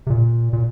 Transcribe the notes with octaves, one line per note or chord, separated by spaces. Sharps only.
C3
A#2
A#2